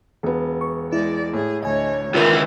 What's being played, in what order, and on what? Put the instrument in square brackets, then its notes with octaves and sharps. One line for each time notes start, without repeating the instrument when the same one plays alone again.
[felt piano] E1 B3
[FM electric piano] C#6
[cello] G#3 D5 [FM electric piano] E4
[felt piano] A2 [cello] G#4
[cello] D2 C#5 [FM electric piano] D#5 G#5
[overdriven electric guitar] C#2 E3 [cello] D#3 [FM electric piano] F4 A#4